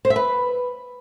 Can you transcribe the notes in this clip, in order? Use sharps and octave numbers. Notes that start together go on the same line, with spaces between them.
C5
E5
B4